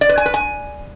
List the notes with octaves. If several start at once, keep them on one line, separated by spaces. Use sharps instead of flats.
D5
B4
G#5
B4
G#5